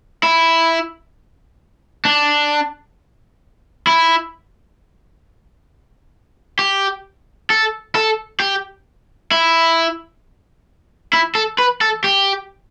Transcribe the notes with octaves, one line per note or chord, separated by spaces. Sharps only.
E4
D4
E4
G4
A4
A4
G4
E4
E4
A4
B4
A4
G4